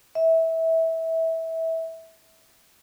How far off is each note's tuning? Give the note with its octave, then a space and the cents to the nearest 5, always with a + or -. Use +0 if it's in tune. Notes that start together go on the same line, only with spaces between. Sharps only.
E5 -20